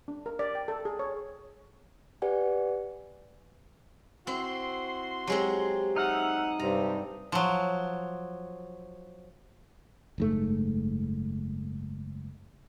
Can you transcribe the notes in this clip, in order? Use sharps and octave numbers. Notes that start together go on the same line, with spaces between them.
D4
A#4
D5
G5
A4
G#4
C#5
G4 B4 D5 F#5 G#5
C4 E4 F#4 C6
F#3 G#3 C4 G4
D#4 E5 F#5 F6
G2 C3 A#5
F3 F#3
F#1 G#2 A3